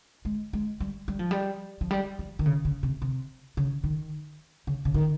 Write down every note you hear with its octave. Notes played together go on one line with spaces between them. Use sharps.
G#3
G#3
G3
G3
F3
G3
F3
G3
F3
D#3
C#3
C#3
C3
C3
C#3
D#3
C#3
C#3
D#3